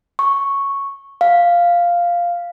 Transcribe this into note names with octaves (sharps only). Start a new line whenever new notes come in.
C#6
F5